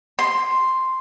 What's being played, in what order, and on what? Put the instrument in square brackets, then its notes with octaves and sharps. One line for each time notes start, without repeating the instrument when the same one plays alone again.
[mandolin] C6